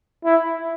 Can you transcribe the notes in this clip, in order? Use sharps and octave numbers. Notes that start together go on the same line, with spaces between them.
E4